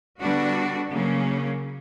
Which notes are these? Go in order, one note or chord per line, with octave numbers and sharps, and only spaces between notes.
D3 G3 B3 D4 F#4
C#3 F#3 A#3 C#4